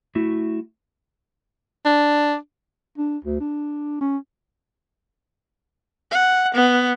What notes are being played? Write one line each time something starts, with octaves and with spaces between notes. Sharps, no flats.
A3 E4 F#4
D4
D4
D2
D4
C#4
F#5
B3